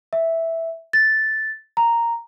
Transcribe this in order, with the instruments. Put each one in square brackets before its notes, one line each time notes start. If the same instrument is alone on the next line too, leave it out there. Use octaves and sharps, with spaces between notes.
[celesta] E5
A6
A#5